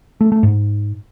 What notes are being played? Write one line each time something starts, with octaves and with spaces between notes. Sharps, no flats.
A3
A3
G#2